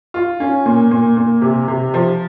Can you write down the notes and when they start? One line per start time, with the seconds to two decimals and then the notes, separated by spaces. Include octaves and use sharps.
0.14 F4
0.40 C#4
0.66 A#2
0.91 A#2
1.17 A#2
1.42 C3
1.68 C3
1.94 F3